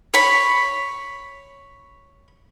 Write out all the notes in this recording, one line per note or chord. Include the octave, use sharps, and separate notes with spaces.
C#5 B5